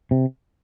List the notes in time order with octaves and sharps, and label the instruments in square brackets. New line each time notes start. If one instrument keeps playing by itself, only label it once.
[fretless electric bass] C3